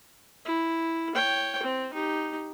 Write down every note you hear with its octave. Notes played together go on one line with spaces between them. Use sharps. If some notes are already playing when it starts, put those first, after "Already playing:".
E4
C#5 G5
C4
D#4 G4